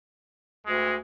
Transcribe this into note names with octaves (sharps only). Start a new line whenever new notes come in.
D2 G#3